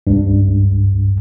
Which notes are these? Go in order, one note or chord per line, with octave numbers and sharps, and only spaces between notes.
C#2 G2